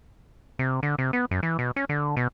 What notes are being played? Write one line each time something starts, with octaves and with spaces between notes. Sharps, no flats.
C3
D3
C3
B3
F#2
E3
B2
C#4
D3
B2